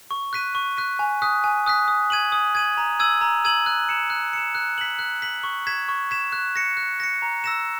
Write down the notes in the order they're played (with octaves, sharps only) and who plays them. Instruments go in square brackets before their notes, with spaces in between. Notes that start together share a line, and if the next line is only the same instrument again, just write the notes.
[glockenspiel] C#6
F#6 B6 D#7
C#6
F#6 B6 D#7
G#5
D#6 F#6 B6
G#5
D#6 F#6 B6
D#6
G#6 D#7 F#7
D#6
G#6 D#7 F#7
A#5
E6 G#6 D#7 F#7
A#5
E6 G#6 D#7 F#7
F#6
C#7 E7
F#6
C#7 E7
F#6
B6 F#7
F#6
B6 F#7
C#6
G#6 B6 E7
C#6
G#6 B6 E7
F#6
A#6 C#7
F#6
A#6 C#7
A#5
E6 A#6 E7